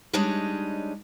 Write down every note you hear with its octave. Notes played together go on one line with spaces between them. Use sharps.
G3 G#3 D4 D#4 C#5 D#5